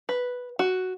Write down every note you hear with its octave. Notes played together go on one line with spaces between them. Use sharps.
B4
F#4